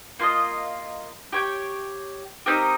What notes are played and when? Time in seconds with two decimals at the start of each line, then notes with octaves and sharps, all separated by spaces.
0.19 A#3 F4 A#4 D#5
1.33 G4 C#5 G5
2.46 C4 D#4 G4 A#4